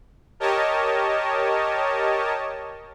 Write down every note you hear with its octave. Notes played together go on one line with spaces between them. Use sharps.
G4 A#4 C#5 D#5 A5